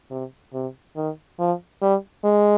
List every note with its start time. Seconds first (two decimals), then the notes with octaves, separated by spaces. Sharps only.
0.11 C3
0.53 C3
0.96 D#3
1.39 F3
1.82 G3
2.24 G#3